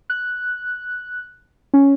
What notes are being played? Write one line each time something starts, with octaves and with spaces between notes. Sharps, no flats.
F#6
C#4